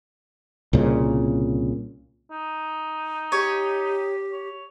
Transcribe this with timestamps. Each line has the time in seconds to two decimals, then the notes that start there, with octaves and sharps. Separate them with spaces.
0.73 C2 A#2 C#3
2.31 D#4
3.32 G4 C#5
4.32 C#5